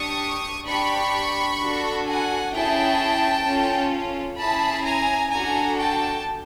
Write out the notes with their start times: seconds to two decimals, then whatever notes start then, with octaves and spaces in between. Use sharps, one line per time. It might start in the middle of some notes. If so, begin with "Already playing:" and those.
Already playing: D4 G4 C#6 D#6
0.67 D4 G4 B5 C#6
1.60 D4 F#4 A4
2.06 F#5 G#5
2.53 C#4 E4 G#4 G5 A5
3.46 C#4 F4 A4
4.39 C#4 E4 G#4 A5 B5
4.85 G#5 A#5
5.32 D4 F#4 A4 G#5 A#5
5.79 G5 A5